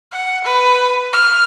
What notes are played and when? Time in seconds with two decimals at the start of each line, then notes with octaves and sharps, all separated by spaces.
0.12 F#5
0.44 B4
1.13 F6